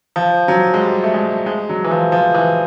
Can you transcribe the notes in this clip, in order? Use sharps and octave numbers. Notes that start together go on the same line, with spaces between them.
F3
F#3
G#3
G3
A3
G#3
G#3
F#3
E3
F3
F3
E3